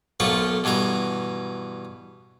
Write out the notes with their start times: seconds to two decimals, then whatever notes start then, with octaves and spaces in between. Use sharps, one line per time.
0.20 B1 F3 A3 A#3 F4 C#6
0.64 G2 B2 E3 G#5 A#5